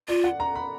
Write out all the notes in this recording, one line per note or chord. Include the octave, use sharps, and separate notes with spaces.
F4 D5
F#5
A#5
B5